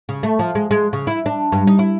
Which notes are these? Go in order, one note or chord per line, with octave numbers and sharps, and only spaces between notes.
C#3
A3
F3
G#3
G#3
C#3
E4
D4
G2
D#4
E4